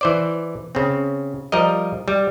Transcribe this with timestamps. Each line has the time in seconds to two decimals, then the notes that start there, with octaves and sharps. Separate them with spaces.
0.01 E3 C5 D5
0.75 C#3 C4
1.52 F3 G3 A#4 D#5
2.08 G3